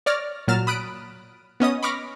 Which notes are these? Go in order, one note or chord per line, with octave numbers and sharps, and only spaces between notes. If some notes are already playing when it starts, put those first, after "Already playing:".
C#5 D5 F6 A#6
A#2 F#3 A#5 F6 A6 E7
B5 D#6 F#6 D7
B3 C#4 D#5 D#6
B5 C#6 D6 F6 A#6